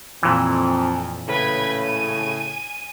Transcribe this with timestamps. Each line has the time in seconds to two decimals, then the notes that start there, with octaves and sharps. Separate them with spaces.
0.23 F2 A#2 E3
1.28 A2 C#3 B4 G#6
1.83 G#5 D#7